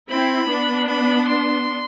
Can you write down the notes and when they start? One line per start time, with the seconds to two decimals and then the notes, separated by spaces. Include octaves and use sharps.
0.10 C4 E4 B5
0.49 B3 D4
0.88 B5
1.28 C6